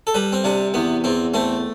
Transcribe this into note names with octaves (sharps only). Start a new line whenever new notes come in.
A4
G3 B4
C4
C3 D4
E2 B3
E2 C4
A3 C4